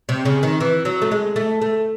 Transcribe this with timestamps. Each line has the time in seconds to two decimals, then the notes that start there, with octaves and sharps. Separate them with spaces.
0.09 C3
0.25 C#3
0.43 D#3
0.60 E3
0.85 F#3
1.02 A3
1.11 G#3
1.36 A3
1.62 A3